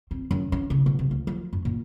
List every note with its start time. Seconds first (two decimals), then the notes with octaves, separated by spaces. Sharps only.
0.11 C4
0.31 F#2
0.52 C#4
0.70 C#3
0.86 B2
0.99 C3
1.11 D2
1.27 F3
1.53 F#2
1.65 A#2